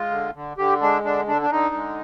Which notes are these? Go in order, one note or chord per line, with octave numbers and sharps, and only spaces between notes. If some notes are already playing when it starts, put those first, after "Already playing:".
Already playing: G#3 F4
D3
D3
D3 G4
G#3 D4
D3 D4
D3 D4
D4
D3 D#4
G#3